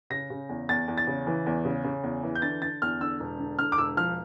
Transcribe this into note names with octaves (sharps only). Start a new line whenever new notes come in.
C#3 A#6
C#3
E2
E2 A6
E2
A6
C#3
E3
E2
C#3
C#3
E2
E3
G6
D3 A6
D3 A6
E2 F6
D3 E6
E1
D3
D3 F6
D6
E1 E6
F3 F6